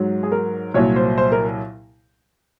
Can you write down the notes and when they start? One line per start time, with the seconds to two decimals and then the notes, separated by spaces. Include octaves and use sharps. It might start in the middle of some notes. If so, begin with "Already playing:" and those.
Already playing: G#2 F#3
0.23 G#4
0.32 A#4
0.74 C2 A#2 F#3 C#5
0.96 C5
1.18 C5
1.32 A#4